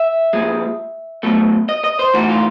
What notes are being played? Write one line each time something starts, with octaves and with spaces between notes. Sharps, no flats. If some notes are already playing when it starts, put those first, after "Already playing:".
Already playing: E5
A#2 F3 G#3
B2 F#3 A3
D#5
D#5
C5
G#2 E3 A3 F#4
F4